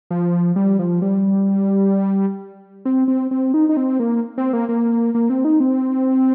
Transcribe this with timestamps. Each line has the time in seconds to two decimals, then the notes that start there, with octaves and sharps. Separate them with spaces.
0.11 F3
0.56 G3
0.79 F3
1.02 G3
2.85 C4
3.08 C4
3.31 C4
3.54 D#4
3.69 D#4
3.77 C4
4.00 A#3
4.38 C4
4.53 A#3
4.69 A#3
5.15 A#3
5.30 C4
5.45 D#4
5.60 C4